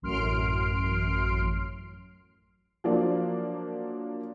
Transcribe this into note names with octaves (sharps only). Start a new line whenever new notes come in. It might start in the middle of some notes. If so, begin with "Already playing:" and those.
A1 F#2 C6 F6 C7 D7
F3 F#3 A#3 D4